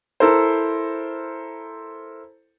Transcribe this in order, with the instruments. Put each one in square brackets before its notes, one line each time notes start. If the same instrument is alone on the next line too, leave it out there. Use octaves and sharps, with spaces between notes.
[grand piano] E4 A4 A#4 C5